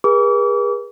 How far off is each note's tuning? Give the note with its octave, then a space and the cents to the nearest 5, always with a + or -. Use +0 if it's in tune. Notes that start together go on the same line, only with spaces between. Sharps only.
G#4 -30 B4 -45 D6 -40